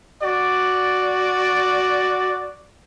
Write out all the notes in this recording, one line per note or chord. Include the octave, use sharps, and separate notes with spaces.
F#4 D5